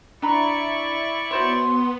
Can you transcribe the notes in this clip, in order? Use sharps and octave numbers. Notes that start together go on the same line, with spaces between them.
D4 E4 D5 A#5 B5 C#6
B3 F#4 C5 C#5 C6